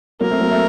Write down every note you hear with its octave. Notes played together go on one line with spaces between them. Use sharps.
F#3 A#3 A#4
A3 C4
F#3 A#3
A3 C4